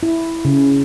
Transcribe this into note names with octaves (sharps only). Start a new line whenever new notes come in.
E4
C#3